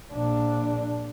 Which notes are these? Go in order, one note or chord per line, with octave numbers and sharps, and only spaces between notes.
A#1 D4